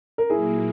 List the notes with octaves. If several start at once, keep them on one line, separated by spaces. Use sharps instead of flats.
A#4
A#2 F#3 A#3 E4 G#4